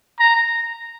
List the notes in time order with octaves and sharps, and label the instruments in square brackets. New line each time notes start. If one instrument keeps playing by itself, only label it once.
[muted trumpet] A#5